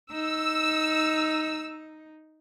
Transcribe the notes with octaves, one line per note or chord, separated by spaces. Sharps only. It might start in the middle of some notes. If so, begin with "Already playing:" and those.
D#4 E6